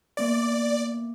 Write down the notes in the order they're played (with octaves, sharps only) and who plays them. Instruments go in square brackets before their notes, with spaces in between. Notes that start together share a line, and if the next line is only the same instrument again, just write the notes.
[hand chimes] A#3 B3 D6 [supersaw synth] D5